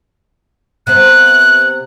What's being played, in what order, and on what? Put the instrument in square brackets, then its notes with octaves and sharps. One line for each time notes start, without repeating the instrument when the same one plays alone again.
[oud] C3 B3 C5 [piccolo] F#6